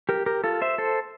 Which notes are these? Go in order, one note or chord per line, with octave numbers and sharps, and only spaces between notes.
G4 A#4
G4 A#4
F4 A4
C5 E5
A4 C5